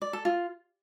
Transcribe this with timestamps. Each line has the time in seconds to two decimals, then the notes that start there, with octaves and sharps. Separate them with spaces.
0.02 D5
0.13 A4
0.25 F4